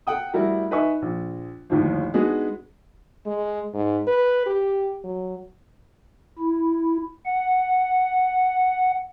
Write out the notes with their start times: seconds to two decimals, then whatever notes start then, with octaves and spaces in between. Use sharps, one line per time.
0.07 A4 F#5 G5 D#6
0.34 G3 A3 E4 F#4 A#4
0.71 D#4 B4 E5 G#5 C#6
1.02 A#1
1.70 G1 D#2 A2 D#3 F3
2.14 G#3 B3 D4 D#4 F#4 G#4
3.26 G#3
3.74 G#2
4.07 B4
4.46 G4
5.04 F#3
6.39 E4
7.26 F#5